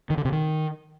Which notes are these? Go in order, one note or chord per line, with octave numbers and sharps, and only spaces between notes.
D#3
D3
C3
D#3